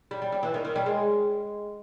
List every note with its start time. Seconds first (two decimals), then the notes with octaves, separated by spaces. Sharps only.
0.11 G3
0.22 G3
0.32 G3
0.43 E3
0.54 D#3
0.65 D#3
0.76 G3
0.86 G#3